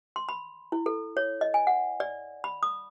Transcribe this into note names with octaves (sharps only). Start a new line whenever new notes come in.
C6
B5
E4
A4
C#5
D#5
G#5
F#5
D5
B5
D#6